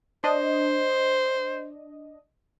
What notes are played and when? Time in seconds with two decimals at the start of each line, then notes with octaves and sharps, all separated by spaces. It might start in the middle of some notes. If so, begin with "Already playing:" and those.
0.24 D4 C5 D#5